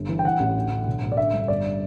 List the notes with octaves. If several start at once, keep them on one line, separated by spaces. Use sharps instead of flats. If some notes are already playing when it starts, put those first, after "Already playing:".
Already playing: G1
E3
G5
E3 F#5
A1
D2
D3
B1
A2
D5
D3 E5
G2
G1 D5